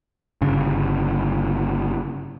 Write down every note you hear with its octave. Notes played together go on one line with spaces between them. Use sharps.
G1 C#3